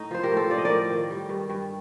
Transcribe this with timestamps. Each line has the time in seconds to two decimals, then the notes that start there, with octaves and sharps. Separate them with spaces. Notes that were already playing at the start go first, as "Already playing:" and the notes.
Already playing: A2 D#4
0.11 F3 C5
0.23 G4 A#4
0.31 A2
0.37 A4 C5
0.50 F3 D5
0.58 D#5
0.65 A#4 D5
0.70 A2
0.90 D#3
1.10 G3
1.29 G2
1.50 G2